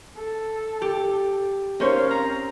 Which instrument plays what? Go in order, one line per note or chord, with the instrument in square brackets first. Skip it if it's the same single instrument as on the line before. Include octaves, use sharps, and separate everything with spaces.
[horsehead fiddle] A4
[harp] G4
[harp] C#4 [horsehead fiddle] D#4 F5 [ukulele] A#4 C5 C#5
[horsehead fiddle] C4 [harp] A#5